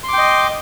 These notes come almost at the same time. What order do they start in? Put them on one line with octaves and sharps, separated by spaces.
C6 D6 G5 D#5